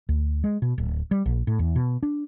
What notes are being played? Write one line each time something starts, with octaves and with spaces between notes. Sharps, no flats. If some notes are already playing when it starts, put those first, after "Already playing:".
D2
G#3
B2
D1
G3
A#1
A2
E2
B2
D4